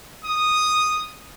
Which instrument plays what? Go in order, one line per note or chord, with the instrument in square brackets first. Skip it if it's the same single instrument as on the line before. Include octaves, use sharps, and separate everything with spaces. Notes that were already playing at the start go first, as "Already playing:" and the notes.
[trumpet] D#6